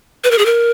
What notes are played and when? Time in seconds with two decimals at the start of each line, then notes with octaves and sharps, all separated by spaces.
0.24 B4
0.31 A#4
0.38 G#4
0.46 A#4